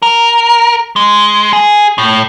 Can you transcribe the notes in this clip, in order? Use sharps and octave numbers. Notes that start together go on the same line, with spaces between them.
A#4
G#3
G#4
A2